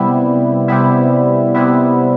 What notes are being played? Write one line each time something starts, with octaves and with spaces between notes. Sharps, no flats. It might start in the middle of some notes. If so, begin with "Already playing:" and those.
Already playing: C3 G3 B3 E4
C3 G3 B3 E4
C3 G3 B3 E4